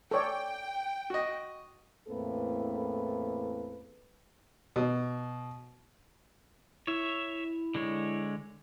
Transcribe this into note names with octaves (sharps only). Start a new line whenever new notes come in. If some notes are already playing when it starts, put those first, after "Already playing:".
A4 C#5 D5 G5
F#4 D#5
E2 A2 A#3 C4 A4 B4
B2
E4 C#5 E5
D3 G#3 C#5